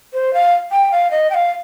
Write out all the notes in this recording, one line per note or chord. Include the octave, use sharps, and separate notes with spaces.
C5
F5
G5
F5
D#5
G5
F5